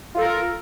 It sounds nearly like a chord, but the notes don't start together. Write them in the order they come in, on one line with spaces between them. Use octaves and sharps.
F4 A4 A#4